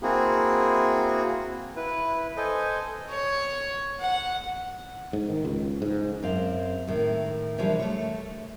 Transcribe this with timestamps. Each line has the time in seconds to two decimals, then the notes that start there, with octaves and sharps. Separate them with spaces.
0.03 A#3 C4 E4 F#4 G#4
1.76 E4 B4
2.37 A4 C5 D#5 G#5
3.09 C#5
4.00 F#5
5.13 G#2
5.29 D#3
5.45 C#2
5.82 G#2
6.23 F#2 C4 F5
6.87 A2 D#3 G#3
7.58 C3 E3 F3 G3 G#3 D4
7.79 A3 C#5